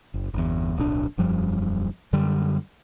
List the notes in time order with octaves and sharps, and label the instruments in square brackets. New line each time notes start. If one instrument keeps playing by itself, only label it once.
[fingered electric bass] F#1
G1 E2
D1 B1 C#4 D4
E1 F#2 F3 G3
F#2 D3 G3